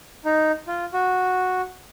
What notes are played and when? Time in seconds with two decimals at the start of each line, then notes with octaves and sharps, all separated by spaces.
0.25 D#4
0.67 F4
0.93 F#4